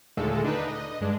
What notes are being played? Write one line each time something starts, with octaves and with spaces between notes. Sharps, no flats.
D#2 A#2 D3 G#3 A3 A4
D3 D4 D#4 B4
D#5
G2 G#3 D4